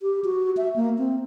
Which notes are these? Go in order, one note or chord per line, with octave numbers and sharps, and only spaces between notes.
G4
F#4
E5
A#3
C4